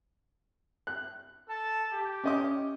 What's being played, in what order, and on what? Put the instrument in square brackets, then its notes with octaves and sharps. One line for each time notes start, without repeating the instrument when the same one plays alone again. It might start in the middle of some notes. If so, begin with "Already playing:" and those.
[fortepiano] F#6
[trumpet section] A4 A5
G4
[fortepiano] C#4 D#5 D6